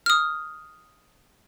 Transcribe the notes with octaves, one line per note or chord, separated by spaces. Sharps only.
D#6 F6